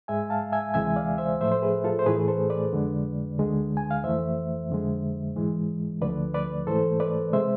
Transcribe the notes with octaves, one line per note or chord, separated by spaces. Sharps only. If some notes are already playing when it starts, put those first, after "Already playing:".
G#2 G#3 E5 G#5
F5 A5
E5 G#5
D2 C3 E3 G#3 E5 G#5
D5 F5
C5 E5
A2 F3 A3 C5 E5
C5
G#4 B4
F4 A4
C5
A2 E3 A3 G#4 B4
A4 C5
B4 D5
F2 D3 G#3
D2 D3 G#3
G#5
F5
F2 E3 A3 C5 E5
F2 D3 G#3
G#2 E3 G#3
D2 D3 F3 A3 B4 D5
B4 D5
G#2 E3 A3 A4 C5
B4 D5
C3 G#3 C5 E5